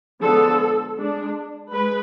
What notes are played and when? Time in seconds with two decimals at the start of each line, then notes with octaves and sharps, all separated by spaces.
0.21 D3 F3 G#3 B3 A4
0.97 G#3 D4
1.72 G#3 B4